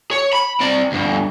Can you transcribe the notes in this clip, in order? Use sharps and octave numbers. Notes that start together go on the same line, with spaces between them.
C#5
B5
C4 D5
D2 G2